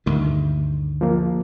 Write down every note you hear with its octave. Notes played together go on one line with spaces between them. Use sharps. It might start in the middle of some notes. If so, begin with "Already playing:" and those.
D2 G2 D#3
F3 A#3